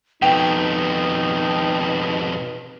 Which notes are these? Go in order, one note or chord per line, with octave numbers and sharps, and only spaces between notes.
F2 B2 D#4 B4 G5